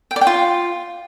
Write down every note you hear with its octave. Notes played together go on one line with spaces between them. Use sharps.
G5
D5
G5
F4